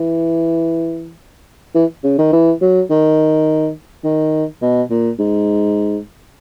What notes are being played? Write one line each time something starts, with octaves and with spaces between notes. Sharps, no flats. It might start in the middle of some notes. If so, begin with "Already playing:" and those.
Already playing: E3
E3
C#3
D#3
E3
F#3
D#3
D#3
B2
A#2
G#2